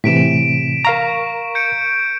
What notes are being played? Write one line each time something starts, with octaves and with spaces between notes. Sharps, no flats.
A2 C3 E3 B6 D7 E7
A#4 F5 A#5 C#6
G6 C#7 D7